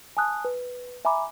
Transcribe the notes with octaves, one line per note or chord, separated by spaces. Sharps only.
G#5 A5 D#6 F#6
B4
E5 G#5 A#5 B5 D6